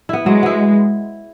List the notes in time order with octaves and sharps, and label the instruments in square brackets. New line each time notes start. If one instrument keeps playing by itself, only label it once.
[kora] B3 E4
[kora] F#3 [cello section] G#3
[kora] B3 E4